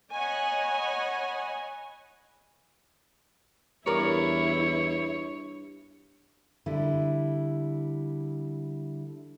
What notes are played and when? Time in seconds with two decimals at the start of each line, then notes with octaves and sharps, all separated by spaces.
0.13 C#5 D#5 F#5 G#5 B5
3.86 E2 G2 E4 A#4 C#5 D5
6.66 D3 G3 E4